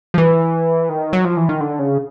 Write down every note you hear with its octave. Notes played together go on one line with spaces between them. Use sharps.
F3
E3
D#3
F#3
F3
E3
D#3
D3
C#3